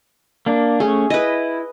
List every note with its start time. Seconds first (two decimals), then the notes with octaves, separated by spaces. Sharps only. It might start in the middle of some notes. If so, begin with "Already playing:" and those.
0.46 A#3 D4
0.80 A3 C#4 G#4
1.10 E4 B4 D#5